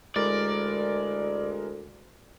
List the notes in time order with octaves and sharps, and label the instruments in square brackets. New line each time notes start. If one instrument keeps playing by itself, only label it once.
[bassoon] D2 [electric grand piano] G#3 E4 A#4 [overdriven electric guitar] D5